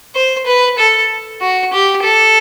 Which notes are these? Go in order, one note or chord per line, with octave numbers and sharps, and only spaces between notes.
C5
B4
A4
F#4
G4
A4